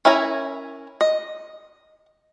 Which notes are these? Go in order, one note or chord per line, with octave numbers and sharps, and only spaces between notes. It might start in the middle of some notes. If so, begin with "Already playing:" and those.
C#4 E4 A#4 G#5 A#5
D#5